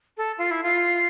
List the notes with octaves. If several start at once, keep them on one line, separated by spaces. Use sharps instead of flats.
A4
F4
E4
F4